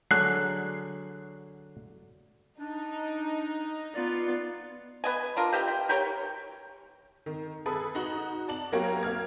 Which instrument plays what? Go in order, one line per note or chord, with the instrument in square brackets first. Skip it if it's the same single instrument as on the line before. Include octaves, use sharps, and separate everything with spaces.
[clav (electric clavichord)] D3 F#3 G#4 [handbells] F#6 C7
[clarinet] D4 [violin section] D#4
[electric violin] B3 F4 [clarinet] D5
[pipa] B3 D#5 G#5
D4 F4 A#4
G4 D#5 E5 G5
G5
G4 A#4 C#5 G5
[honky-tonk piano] D#3
G#4 A4 B4 B5 D#6
D#4 F#4 F#7
D5 A5 F#7
F#3 A#3 B3 G4 A#4 C#5
A#3 F6 G#6